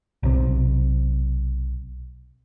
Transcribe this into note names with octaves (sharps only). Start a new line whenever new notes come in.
B1 C3